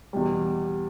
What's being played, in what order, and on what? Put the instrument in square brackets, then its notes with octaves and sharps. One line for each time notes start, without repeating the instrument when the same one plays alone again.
[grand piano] E2 B2 G3